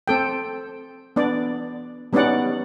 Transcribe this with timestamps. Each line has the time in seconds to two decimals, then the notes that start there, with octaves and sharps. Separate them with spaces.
0.08 C4 A4 G5
1.16 B3 D4 D5
2.13 G3 B3 C#4 D#4 D5 F#5